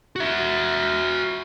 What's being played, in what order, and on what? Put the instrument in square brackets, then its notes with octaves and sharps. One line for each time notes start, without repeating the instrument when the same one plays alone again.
[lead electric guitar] F#4 E5